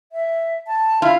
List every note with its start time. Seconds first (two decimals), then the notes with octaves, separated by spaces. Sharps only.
0.12 E5
0.67 A5
1.02 E4 F4